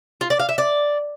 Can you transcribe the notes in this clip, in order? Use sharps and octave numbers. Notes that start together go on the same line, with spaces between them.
F4
D5
F5
E5
D5